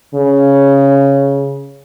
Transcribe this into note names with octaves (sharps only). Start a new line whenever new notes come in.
C#3